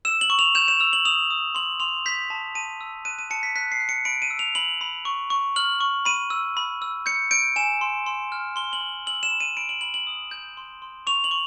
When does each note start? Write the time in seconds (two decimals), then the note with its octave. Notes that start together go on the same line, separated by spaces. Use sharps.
0.05 E6 E7
0.21 F#7
0.30 C#6
0.39 F7
0.55 G6 E7
0.68 E7
0.80 E6 F7
0.93 F#7
1.05 D#6 F7
1.31 D#6
1.55 C6 F#7
1.80 C6 F7
2.06 G6 B6
2.30 A5
2.55 A5 D#7
2.81 E6
3.05 F#6 D#7
3.19 D#7
3.31 A5 C#7
3.43 B6
3.56 F#6 B6
3.72 C7
3.80 F#6
3.89 C#7
4.05 B5 D7
4.22 D#7
4.30 E6
4.39 F7
4.55 B5 F#7
4.81 B5
5.05 C#6
5.30 C#6
5.56 F6 F#7
5.81 C#6
6.05 B5 D#7
6.30 E6
6.57 B5
6.82 E6
7.06 G6 C#7
7.31 G6 D7
7.56 G#5 E7
7.81 C6
8.06 C6
8.32 F6
8.56 C6 G7
8.73 F#7
8.81 C6
9.06 E6 F#7
9.23 E7
9.31 B5
9.40 D#7
9.57 B5 D7
9.69 F#7
9.81 B5 F#7
9.94 F#7
10.07 D#6
10.31 G6
10.57 C6
10.82 C6
11.07 C#6 F7
11.24 F#7
11.31 C#6